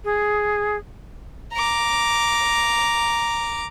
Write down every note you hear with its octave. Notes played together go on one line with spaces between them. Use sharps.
G#4
A#5 D6